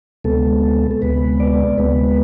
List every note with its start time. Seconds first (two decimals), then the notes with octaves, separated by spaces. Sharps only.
0.24 D2 C3 G#3 B3 A4
0.91 A4
1.02 D2 C3 G#3 B3 B4
1.40 D5
1.78 D2 C3 G#3 B3 B4